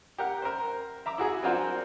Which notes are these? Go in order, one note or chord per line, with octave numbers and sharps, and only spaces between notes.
G4 A#4 F#5
A#4 C5
E5 A#5 D6
E4 F#4 G#4
C4 D4 F4 F#4 A#4 C5